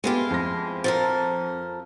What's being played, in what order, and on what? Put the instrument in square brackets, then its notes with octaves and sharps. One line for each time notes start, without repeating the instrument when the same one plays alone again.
[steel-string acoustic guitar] G#3 E4 F4 [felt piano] A3 B3 G4
[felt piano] F2 A#6
[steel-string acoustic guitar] F3 A4 A#4